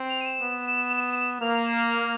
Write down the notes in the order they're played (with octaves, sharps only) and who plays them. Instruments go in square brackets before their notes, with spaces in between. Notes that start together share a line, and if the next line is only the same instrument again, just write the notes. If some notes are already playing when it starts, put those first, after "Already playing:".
Already playing: [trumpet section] C4
[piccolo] F7
D#7
E7
[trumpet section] B3
[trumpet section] A#3 [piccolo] F7
[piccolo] F7
E7
F7
F7